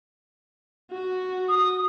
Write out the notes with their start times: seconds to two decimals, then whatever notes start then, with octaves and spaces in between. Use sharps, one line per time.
0.91 F#4
1.49 D#6